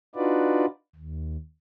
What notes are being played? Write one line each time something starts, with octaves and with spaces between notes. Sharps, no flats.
D4 D#4 F4 F#4 B4 D5
D#2